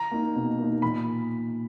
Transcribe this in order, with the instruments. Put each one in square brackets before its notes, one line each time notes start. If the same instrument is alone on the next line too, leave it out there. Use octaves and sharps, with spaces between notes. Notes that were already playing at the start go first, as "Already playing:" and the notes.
Already playing: [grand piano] A#5
A#3 D#4
B2
A#3 D#4
A#2 B5